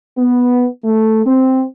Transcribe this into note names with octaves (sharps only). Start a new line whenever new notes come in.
B3
A3
C4